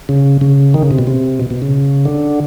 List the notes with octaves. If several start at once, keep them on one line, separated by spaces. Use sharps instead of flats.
C#3
C#3
D#3
C#3
C3
B2
C3
B2
B2
C#3
D3